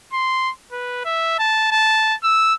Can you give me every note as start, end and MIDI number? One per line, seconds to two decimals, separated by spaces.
0.13 0.50 84
0.72 1.03 71
1.05 1.38 76
1.39 1.67 81
1.71 2.15 81
2.24 2.54 88